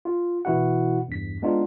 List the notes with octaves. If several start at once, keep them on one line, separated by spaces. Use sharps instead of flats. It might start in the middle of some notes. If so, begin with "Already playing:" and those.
F4
B2 E3 E4 F#4 F#5
E2 G2 B6
G#3 B3 D4 D#4 F4